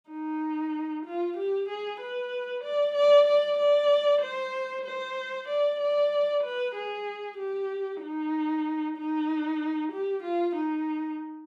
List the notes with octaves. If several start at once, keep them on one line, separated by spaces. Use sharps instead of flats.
D#4
F4
G4
G#4
B4
D5
D5
D5
D5
C5
C5
D5
D5
B4
G#4
G4
D#4
D#4
G4
F4
D#4